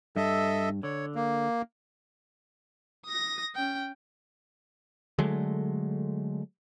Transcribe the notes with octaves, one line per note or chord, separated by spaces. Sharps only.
G2 A4 D#5 E5
D3 C#5
A#3
D#6 A#6
C#4 G5
D3 F#3 G#3 A3